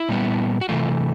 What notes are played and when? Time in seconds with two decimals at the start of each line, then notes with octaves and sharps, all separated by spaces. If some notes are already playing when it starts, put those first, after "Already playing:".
Already playing: E4
0.09 A#2 G3 B3
0.61 F#4
0.69 C3 E3 A3 F4